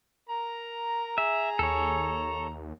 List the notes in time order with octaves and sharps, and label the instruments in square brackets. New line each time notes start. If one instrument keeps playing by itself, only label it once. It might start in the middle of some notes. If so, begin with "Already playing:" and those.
[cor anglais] A#4 [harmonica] A#5
[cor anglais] G#4 [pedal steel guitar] E5
[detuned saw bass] D#2 [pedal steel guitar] A4 C#5